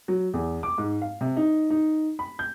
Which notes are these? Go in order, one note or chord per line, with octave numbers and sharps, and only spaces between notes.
F#3
E2
D6
G#2
F5
C3
D#4
D#4
B5
G6